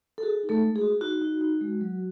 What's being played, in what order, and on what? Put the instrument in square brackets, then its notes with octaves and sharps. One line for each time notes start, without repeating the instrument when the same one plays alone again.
[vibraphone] A4
F#4 G#4
D#4
A3 A4
G#3
G#4
F#4
D#4 F#4
D#4
D#4
G#3
F#3